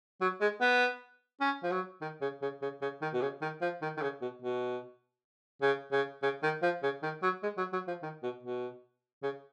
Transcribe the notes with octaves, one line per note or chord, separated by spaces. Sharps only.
F#3
G#3
B3
C#4
F3
F#3
D#3
C#3
C#3
C#3
C#3
D#3
B2
C#3
D#3
F3
D#3
D#3
C#3
B2
B2
C#3
C#3
C#3
D#3
F3
C#3
D#3
F#3
G#3
F#3
F#3
F3
D#3
B2
B2
C#3